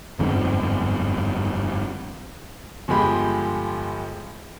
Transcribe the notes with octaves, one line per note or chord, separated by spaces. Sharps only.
G1 F2 G#2
G1 F3 G#3 G4 B5